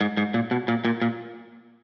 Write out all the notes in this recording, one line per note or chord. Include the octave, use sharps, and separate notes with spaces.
G#2
G#2
A#2
B2
A#2
A#2
A#2